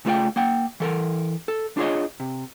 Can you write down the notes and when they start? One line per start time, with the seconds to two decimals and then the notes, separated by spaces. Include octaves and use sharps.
0.05 C#3 A3 F4 A4 D5 G5
0.36 A#3 F#5 G5
0.80 E3 A4 A#4
1.48 A4
1.77 D4 F4 G#4 C#5 D#5
2.20 C3